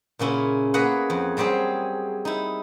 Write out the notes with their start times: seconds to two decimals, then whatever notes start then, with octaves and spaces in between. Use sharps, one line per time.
0.19 A#2 C#3 C#4 E4
0.74 A#3 B3 F#4 G#4 B4 F#5
1.10 F2
1.37 F#3 G3 C4 G4 G#4
2.25 D#4 E4